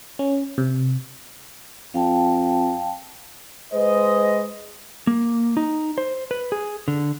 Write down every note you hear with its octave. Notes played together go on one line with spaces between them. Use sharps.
C#4
C3
F2 F5 G5 A5
G#3 B4 C5 D#5
A#3
D#4
C5
B4
G#4
D3